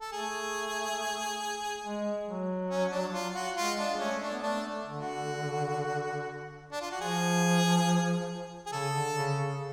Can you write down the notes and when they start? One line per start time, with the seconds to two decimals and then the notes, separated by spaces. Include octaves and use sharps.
0.01 A4
0.12 A3 G#4
1.84 G#3
2.27 F#3
2.70 C#4
2.92 D4
3.13 F4
3.35 F#4
3.56 G#3 F4
3.78 D4
3.94 G#3
3.99 A3 C#4
4.21 D4
4.33 B3
4.42 A3 D4
4.85 D3
5.00 F#4
6.72 D4
6.81 F4
6.91 F#4
7.00 F3 G#4
8.66 G#4
8.72 C#3 A4
8.94 D3
9.16 C#3
9.36 C#3